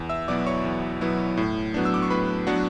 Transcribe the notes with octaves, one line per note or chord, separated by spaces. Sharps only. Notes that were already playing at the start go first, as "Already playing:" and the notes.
Already playing: E2
E5 E6
B2 F#3 B3 E4 D5 D6
C#5 C#6
E2
B2 F#3 B3 E4
A2
F#3 B3 D4
E6
D6
C#6
A2 B4 B5
F#3 B3 D4 F#4 F#5